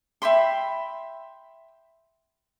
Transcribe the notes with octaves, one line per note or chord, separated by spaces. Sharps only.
E5 G5 B5 C6